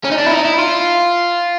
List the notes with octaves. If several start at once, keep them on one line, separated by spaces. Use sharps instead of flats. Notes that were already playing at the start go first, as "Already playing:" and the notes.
C#4
D#4
D4
E4
D#4
E4
F4